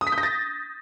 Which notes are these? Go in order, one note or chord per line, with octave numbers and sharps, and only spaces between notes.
D#6
B6
G6
A#6
A6